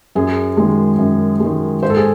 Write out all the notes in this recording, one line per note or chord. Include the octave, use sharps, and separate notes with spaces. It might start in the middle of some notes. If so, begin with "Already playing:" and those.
F#2 G#4
D#3 G#3
F#2
D#3 G#3
G#2 C5
A4
G#4